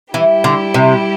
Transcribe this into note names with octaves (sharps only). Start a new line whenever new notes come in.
E3 G3 E4 G4
D3
C3